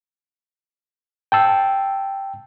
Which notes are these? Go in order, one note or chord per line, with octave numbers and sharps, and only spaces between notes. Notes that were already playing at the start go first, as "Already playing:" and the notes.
G5 A5 E6